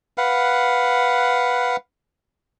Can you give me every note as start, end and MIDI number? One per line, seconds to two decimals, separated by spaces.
0.18 1.76 71
0.18 1.76 77
0.18 1.76 78